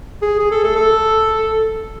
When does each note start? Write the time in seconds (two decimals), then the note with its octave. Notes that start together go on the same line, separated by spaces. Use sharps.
0.22 G#4
0.39 G#4
0.51 A4
0.64 A4
0.76 A4